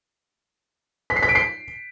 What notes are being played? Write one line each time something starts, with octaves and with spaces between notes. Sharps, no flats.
B6
C7
B6
D7
C7